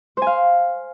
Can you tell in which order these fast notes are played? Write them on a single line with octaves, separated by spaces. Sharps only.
C5 G#5 F5